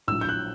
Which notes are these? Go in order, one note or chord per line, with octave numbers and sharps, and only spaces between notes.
A#1 A2 F#3 E6
G6
F#6